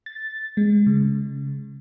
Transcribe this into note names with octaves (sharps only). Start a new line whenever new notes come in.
A6
G#3
C#3